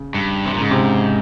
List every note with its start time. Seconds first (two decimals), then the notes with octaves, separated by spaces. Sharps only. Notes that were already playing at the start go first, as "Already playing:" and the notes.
Already playing: C#3
0.14 G2
0.46 C3
0.54 A#2
0.61 G#2 C#3
0.71 C3
0.80 C#3